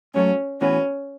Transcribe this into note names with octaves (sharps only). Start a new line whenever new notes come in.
G#2 F#3 A3 C#4
A2 E3 B3 C#4 F#4 B4